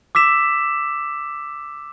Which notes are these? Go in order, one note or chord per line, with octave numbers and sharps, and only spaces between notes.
D6 E6 B6 E7